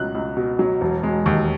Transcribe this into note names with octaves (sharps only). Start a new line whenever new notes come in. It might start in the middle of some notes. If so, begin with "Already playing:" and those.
Already playing: C#2 B2 F#3 F#6
C#2
B2
F#3
E1
G#3
D#2